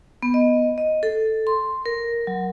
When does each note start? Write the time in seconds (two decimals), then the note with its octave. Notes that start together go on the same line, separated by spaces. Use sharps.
0.23 B3
0.34 D#5
0.78 D#5
1.03 A4
1.47 C6
1.86 A#4
2.27 F#3